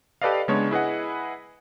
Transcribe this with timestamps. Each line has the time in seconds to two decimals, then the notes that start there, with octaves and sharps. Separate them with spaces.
0.22 G4 A4 B4 D5 D#5 F5
0.48 C#3 G#3 B3 D4 C#5
0.71 E4 G#4 B4 D#5 F#5